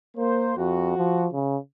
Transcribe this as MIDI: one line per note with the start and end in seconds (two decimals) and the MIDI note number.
0.17 0.53 58
0.17 0.53 72
0.58 0.95 41
0.58 1.26 66
0.98 1.27 53
1.33 1.57 49